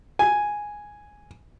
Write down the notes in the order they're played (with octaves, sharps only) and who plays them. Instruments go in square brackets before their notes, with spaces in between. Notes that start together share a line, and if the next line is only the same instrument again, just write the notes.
[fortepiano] G#5